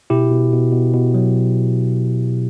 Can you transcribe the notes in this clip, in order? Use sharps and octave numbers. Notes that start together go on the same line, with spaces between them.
B2 E4 G4
B2
B2
B2
B2
F#3